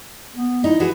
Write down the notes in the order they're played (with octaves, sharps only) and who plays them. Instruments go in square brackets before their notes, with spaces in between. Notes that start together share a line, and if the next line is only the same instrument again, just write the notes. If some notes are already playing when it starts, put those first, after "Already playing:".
[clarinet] B3
[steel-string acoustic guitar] D#4 [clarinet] E4
[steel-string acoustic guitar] E3 F#4 G#4